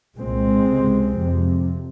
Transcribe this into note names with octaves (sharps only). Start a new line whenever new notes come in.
C2 A#2 G#3 C4
C#2 C3
F2 C3